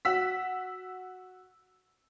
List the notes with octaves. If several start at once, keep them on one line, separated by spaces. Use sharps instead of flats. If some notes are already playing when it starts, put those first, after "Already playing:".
F#4 E6 B6